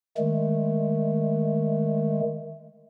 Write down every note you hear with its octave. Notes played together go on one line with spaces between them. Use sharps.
D#3 G#3 A3